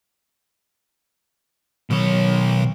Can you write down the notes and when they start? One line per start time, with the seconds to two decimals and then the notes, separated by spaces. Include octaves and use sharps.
1.91 B2 D#3 F#3 C#5